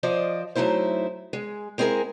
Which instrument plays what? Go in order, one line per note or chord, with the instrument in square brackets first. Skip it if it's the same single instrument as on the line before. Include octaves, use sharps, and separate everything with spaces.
[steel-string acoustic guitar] F3 C5 D5 D#5
F#3 A3 D#4 E4 C5
G#3
G#3 C4 E4 G#4 A#4